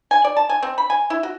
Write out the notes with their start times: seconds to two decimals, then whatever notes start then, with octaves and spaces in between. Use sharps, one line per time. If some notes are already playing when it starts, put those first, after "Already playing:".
0.11 G#5
0.24 D5
0.37 A5
0.49 G#5
0.63 C4
0.78 B5
0.90 G#5
1.10 E4
1.23 F#4